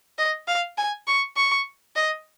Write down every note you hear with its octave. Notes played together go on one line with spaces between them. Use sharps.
D#5
F5
G#5
C#6
C#6
D#5